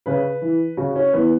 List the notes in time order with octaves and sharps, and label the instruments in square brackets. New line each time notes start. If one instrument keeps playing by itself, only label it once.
[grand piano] C#3 B4
E3
C#3 F#4
C#4
E3 B3